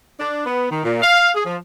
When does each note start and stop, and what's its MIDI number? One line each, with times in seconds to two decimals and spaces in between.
0.20 0.42 62
0.46 0.69 59
0.70 0.83 51
0.84 1.01 46
1.02 1.29 77
1.33 1.44 68
1.46 1.56 53